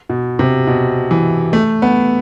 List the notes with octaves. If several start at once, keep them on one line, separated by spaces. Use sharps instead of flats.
B2
C3
B2
E3
A3
B3